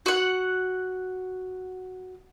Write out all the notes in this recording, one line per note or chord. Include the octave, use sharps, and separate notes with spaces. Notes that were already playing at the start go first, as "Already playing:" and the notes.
F#4 F#5